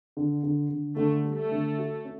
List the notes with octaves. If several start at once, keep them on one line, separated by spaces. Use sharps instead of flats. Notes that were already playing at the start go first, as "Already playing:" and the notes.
D3
D3
D3
D3 A3
G3
A3
D3
F#4
C#4